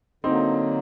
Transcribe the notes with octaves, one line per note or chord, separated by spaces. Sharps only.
D3 F#3 A#3 C4 D#4